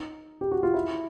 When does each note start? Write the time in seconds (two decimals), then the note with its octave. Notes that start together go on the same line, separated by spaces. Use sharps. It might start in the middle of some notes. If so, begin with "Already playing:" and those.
Already playing: D#4
0.41 G4
0.52 F#4
0.63 F4
0.74 E4